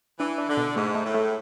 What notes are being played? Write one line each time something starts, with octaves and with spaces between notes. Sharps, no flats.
E3 D4
D4
D3
B2
G#2 A3
A3
A2
A3